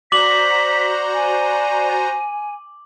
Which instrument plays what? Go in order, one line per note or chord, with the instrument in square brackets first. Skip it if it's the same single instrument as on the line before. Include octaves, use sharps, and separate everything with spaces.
[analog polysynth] F#4 C5 A#5 [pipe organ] D5 [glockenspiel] D6 F#7 [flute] B6
[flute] G#5